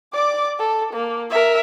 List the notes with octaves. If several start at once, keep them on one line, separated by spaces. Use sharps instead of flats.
D5 D6
A4
A#3
A#4 E5